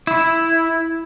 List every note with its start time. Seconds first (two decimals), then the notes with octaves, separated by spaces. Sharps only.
0.07 E4